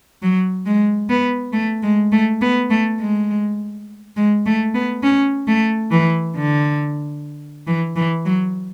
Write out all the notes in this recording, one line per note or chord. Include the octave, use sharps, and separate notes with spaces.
F#3
G#3
B3
A3
G#3
A3
B3
A3
G#3
G#3
A3
B3
C#4
A3
E3
D3
E3
E3
F#3